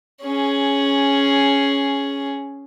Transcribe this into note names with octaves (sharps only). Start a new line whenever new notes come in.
C#4 G#4